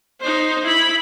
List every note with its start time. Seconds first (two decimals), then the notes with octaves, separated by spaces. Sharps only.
0.21 D#4 C5
0.65 E4 B5